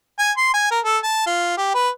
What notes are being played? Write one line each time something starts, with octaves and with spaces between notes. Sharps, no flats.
G#5
C6
G#5
A#4
A4
A5
F4
G4
B4